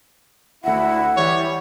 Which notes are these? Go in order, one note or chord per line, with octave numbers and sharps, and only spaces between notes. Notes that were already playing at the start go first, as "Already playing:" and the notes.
D2 E4 F#5
E3 G3 C#5